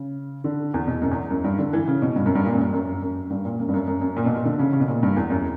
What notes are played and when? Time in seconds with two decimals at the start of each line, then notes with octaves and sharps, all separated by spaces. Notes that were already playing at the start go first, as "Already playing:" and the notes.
Already playing: C#3
0.44 D3
0.74 E2
0.88 B2
1.02 F#2
1.11 E2
1.31 F#2
1.44 G2
1.58 D3
1.73 E3
1.88 C#3
2.02 B2
2.16 G2
2.26 F#2
2.35 G2
2.45 A#2
2.53 F#2
2.60 G2
2.73 F#2
3.02 F#2
3.30 G2
3.45 A#2
3.60 F#2
3.69 G2
3.74 F#2
3.88 F#2
4.02 F#2
4.17 A#2
4.26 B2
4.35 A#2
4.45 D3
4.59 C#3
4.73 C#3
4.80 B2
4.88 A#2
5.03 G2
5.16 E2
5.30 F#2